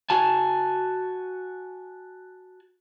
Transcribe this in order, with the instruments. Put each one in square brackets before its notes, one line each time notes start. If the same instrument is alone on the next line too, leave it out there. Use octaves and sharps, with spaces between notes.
[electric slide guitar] F#4 G#5 A5